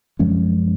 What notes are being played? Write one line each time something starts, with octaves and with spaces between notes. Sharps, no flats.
F#2 F3 G#3 C#4